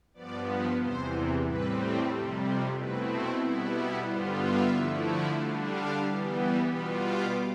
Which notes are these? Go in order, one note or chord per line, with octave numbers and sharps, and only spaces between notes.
G2 F3 B3 D5
E2 C3 E3 C5
A2 G3 C4 B4
F2 C3 G3 A4
C5
B2 A3 C4 E4 B4
B2 G3 B3 E4 A4
B4
G2 D3 G3 B3 F4 C5
E5
D3 F3 A3 E4
D3 G3 D4 F5
F5
E3 G3 B3
G5
B2 G3 B3 F4 B5
D6